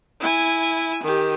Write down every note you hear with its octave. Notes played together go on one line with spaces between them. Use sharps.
E4 G#5
D#3 G4